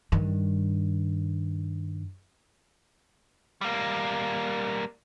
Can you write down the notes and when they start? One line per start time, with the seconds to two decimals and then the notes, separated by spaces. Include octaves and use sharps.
0.12 G2 D#3
3.61 G3 A#3